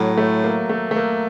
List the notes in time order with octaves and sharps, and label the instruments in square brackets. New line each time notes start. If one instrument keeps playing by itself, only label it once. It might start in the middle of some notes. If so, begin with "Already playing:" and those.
Already playing: [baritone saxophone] A2 [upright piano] F#3
[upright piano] A3
A#3
A3
A3
A#3